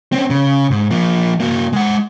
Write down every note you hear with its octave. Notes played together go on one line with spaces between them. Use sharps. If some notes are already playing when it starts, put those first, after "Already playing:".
C4 C#4
C#3
G#2
F3 A#3
A#3 F#4
G#3 F#5